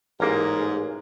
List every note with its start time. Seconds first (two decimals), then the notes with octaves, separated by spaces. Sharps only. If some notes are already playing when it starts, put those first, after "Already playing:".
0.20 A1 G#2 A#3 G#4 A#4